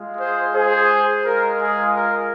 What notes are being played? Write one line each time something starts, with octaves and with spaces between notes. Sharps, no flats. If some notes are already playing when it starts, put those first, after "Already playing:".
Already playing: G#3 F4
G#4 C5
G#4 C5
G#3 F4 A#4
G#4
A#4